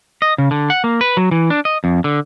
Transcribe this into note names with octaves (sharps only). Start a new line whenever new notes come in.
D#5
C#3
D3
F#5
A#3
B4
F#3
E3
D4
D#5
F2
D3